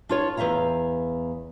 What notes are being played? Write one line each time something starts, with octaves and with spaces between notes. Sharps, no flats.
D4 F4 C#5
E2 G#3 E5 F5 A#5